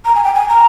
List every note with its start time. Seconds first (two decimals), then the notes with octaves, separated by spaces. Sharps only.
0.05 A#5
0.15 G#5
0.24 G5
0.35 G#5
0.49 A#5